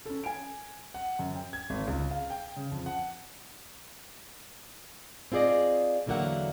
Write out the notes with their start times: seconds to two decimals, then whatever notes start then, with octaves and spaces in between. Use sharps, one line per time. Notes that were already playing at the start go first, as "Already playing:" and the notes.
0.06 C#4 A4
0.24 G#5 D7
0.94 F#5
1.19 F#2
1.35 G5
1.53 G#6
1.70 G#1
1.87 C#2
2.11 F5
2.30 G5
2.56 C#3
2.72 F2
2.86 F#5
5.32 C4 F4 G#4 D5 D#5
6.06 E2 D3 F#3 A#3 E5 F#5